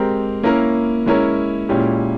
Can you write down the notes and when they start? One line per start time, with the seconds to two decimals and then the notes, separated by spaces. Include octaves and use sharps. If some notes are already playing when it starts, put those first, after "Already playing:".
Already playing: G#3 C4 G4 A#4
0.43 A#3 C#4 E4 A#4
1.06 G#3 C#4 E4 A#4 C#5
1.69 A#2 G#3 C#4 E4 G4